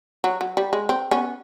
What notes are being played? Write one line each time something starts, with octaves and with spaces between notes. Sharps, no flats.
F#3
F#3
G3
G#3
C4
B3 C#4